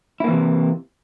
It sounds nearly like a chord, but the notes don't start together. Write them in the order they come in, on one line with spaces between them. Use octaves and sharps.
E4 A#3 E3 C3